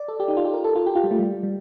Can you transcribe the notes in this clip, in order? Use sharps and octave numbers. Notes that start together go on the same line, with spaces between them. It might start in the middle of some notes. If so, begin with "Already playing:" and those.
Already playing: D5
A4
G4
D#4
F4
G4
A#4
A4
F4
G4
F4
G3
A3
G3
G3